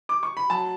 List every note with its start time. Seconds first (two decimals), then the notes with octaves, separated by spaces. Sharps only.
0.09 D6
0.23 C#6
0.37 B5
0.50 F#3 A5